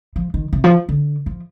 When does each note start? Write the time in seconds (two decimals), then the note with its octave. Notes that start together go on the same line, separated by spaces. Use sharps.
0.16 F3
0.34 D#3
0.53 C3
0.64 F3
0.89 D3
1.26 F3